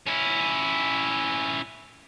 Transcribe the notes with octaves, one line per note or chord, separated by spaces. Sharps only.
C#4 E4